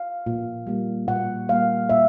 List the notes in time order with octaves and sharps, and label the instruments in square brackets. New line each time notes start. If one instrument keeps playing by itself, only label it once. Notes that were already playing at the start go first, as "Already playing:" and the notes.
Already playing: [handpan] F5
A#2
G3 A#3
A#2 F#5
G3 A#3 F5
A#2 E5